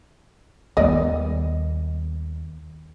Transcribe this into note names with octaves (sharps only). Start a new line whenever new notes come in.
D#2 G3 B3 D5 D#5